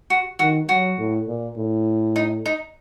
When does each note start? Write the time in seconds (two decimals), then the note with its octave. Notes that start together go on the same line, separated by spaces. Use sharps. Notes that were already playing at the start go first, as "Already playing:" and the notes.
0.10 F#4
0.39 D#3 F#4
0.69 F#3 F#4
0.98 A2
1.27 A#2
1.57 A2
2.16 D#4
2.46 D#4